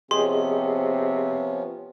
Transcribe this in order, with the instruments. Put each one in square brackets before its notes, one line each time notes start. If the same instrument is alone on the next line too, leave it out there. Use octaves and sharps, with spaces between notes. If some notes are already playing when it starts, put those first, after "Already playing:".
[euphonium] C3 [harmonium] F3 B3 C#4 [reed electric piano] G4 G#4 D#5 [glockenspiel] C6